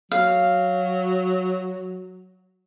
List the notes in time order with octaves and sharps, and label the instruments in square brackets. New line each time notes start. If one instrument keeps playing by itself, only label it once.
[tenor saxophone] F#3 [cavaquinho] F5